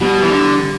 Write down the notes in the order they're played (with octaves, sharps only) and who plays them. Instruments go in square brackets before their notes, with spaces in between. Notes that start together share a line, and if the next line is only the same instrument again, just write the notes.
[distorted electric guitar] B2 [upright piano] G3
[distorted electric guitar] E3
D3